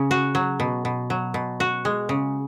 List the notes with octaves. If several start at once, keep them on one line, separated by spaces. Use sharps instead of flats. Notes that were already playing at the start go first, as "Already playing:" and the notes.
Already playing: C#3
F#4
F#3
B2
B2
F#3
B2
F#4
G#3
C#3